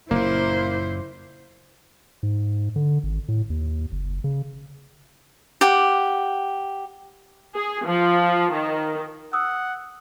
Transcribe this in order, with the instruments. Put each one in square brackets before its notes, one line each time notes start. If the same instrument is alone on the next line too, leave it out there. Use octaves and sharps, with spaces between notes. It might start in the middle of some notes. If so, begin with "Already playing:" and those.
[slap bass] F#1 A#2 [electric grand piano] A#3 [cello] E4 C5
[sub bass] G#2
D3
G#1
A2
D#2
F#1
C#3
[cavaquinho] G4 F#5
[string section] G#4
F3
D#3
[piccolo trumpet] F#5 [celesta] D#6 E6